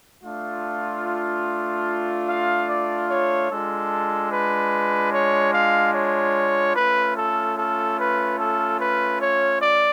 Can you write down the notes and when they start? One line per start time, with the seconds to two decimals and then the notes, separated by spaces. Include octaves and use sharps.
0.24 A3 D4 F4
2.27 F5
2.68 D5
3.08 C#5
3.50 G#3 D4 F4 A4
4.31 B4
5.12 C#5
5.53 F5
5.93 C#5
6.75 A3 C#4 F4 B4
7.16 A4
7.58 A4
7.98 B4
8.38 A4
8.80 B4
9.20 C#5
9.61 D5